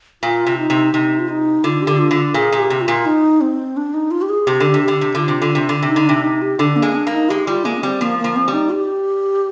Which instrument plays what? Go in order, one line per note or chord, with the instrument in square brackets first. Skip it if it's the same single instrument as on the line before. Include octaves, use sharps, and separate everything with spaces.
[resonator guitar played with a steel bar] A#2 [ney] F4
[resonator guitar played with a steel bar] C3
[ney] D#4
[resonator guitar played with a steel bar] C3
[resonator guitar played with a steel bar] C3 [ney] D#4
[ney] F4
D#4
[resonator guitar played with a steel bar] D3 [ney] F4
[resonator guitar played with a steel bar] D3 [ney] G4
[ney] F4
[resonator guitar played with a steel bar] D3
[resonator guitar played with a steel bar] A#2 [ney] G#4
[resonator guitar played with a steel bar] A#2
[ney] G4
[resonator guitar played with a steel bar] C3
[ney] F4
[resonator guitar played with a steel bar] A#2
[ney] D#4
C4
D4
D#4
F4
G4
G#4
[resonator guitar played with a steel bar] C3 [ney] G4
[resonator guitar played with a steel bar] D3
C3
[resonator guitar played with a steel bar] D3 [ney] G4
[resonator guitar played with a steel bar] C3
[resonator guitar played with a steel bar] D3 [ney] F4
[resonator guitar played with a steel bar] C3
D3
C3
D3
C3
[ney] D#4
[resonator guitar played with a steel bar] D3
[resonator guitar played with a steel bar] C3 [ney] D4
[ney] D#4
G4
[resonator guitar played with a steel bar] D3 [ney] D4
[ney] A#3
[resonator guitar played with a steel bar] G#3
[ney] D4
[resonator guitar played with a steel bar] A#3
[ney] D#4
[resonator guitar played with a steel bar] G#3 [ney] G4
[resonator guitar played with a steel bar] G3 [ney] F4
[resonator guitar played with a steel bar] G#3 [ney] A#3
[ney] D4
[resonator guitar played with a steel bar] G3 [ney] C4
[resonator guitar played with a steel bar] F3 [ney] A#3
[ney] A#3
[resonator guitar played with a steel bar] F3
[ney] C4
[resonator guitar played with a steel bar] G3
[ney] D#4
G4